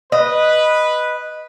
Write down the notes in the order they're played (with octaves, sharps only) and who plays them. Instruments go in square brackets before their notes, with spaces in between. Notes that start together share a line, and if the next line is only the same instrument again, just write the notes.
[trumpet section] B4 [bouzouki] D#5